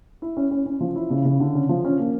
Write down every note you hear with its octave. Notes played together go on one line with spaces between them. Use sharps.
E4
C#4
C#4
C#4
F3
E4
C#3
C#3
D3
C#4
F3
C#4
A#3